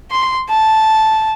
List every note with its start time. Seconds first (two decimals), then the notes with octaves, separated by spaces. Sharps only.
0.11 C6
0.50 A5